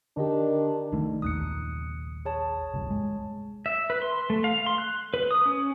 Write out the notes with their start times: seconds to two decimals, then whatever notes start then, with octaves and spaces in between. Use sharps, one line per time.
0.17 D3 D#3 D4 G4
0.92 C2 D#3 A3 D#4
1.22 A1 D#2 A#2 D#6 F#6 C#7
2.25 G#4 C#5 A5
2.74 D1 G1 C2
2.90 G#3
3.66 E5
3.90 B4
4.02 C6
4.30 A3
4.44 F5
4.66 C6
4.78 F#6
5.14 B4
5.31 D#6
5.46 C#4